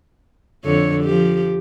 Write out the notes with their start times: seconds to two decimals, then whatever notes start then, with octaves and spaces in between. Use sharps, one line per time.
0.65 F2 D3 C#5
1.04 F3 G4